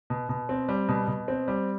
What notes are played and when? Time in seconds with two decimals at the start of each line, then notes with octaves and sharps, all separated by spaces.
0.10 B2
0.29 B2
0.49 C4
0.69 G3
0.88 B2
1.08 B2
1.28 C4
1.48 G3